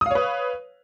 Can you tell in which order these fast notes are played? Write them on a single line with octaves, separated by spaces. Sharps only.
D#6 F5 C#5 B4